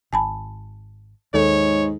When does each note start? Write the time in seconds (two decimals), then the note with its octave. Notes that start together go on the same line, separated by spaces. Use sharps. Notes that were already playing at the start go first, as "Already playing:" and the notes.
0.13 G#1 G#5 A5 B5
1.34 D#2 G#2 A4 C#5